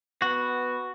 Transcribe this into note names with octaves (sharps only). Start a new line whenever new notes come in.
B3 F#4